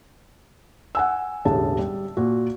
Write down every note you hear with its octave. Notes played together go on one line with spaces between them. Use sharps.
F#5 G#5 E6
E1 A1 D3 G4 G#4 A5
G3
A#2 F#4